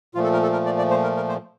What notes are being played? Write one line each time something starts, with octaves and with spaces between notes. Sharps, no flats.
A#2 F3 A3 F4
A4
A#4
A4
A#4
D5
D5
C5
A#4
A#4
C5